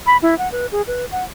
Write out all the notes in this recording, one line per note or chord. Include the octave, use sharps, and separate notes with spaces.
B5
E4
F#5
B4
G#4
B4
F#5